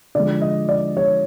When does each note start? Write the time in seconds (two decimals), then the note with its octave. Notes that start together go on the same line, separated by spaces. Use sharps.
0.15 D3 F3 G#3 D5
0.42 D#5
0.69 D5
0.97 C#5